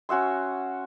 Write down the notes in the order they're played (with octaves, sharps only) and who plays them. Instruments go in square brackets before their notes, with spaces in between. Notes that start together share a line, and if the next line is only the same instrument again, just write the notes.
[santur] C#4 F#4 E5 C6